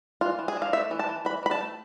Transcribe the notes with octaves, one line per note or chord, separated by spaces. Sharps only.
E3 F4
E3
G#4
D4
F5
A3 E5
E3
A5
E3
E3 B5
E3 B5
A5
A3